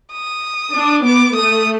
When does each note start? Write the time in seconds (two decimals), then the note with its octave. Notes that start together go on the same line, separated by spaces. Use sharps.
0.12 D#6
0.74 D4
1.05 B3 D6
1.36 A3 D#6